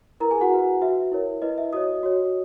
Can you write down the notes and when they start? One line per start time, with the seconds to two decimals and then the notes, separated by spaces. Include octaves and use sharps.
0.20 E4 A#4 B4 A#5
0.31 G#4 G#5
0.41 F#4 F#5
0.51 E4 B4
0.81 F#4 B4 E5
1.12 E4 A#4 C#5
1.42 E4 B4 D#5
1.58 E5
1.73 F#4 C#5 D#5 D#6
2.03 F#4 C#5